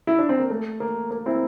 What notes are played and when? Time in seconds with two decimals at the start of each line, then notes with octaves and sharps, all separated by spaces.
0.07 E4
0.19 D4
0.29 C4
0.39 A#3
0.50 A3
0.80 A#3
1.11 A#3
1.26 C4 E4